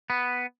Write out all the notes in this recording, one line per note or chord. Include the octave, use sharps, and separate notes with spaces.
B3